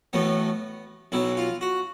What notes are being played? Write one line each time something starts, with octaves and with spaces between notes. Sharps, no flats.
A1 A2 F#3 A3 B3
B1 B2 F#3 E4
F4
F#4